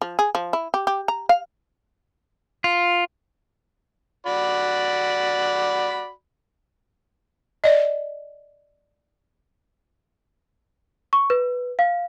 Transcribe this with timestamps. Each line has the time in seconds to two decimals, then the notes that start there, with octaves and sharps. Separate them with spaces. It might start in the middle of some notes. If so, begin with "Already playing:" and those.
0.01 F3
0.19 G#4
0.35 F3
0.53 E4
0.74 G4
0.87 G4
1.08 A#5
1.29 F5
2.64 F4
4.26 F#4 D5 B5
7.64 D5 D#5
11.13 C#6
11.30 B4
11.79 F5